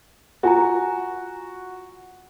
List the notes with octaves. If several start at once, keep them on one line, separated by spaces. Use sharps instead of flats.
F4 F#4 G#5 A#5